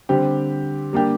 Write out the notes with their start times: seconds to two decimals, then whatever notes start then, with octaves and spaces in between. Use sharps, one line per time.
0.09 D3 G3 C4 G4
0.93 G3 A#3 D4 G4